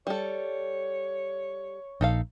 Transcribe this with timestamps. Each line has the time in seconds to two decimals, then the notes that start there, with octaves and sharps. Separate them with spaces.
0.07 G3 A4 C#5
2.01 A#1 D#4 A4 F5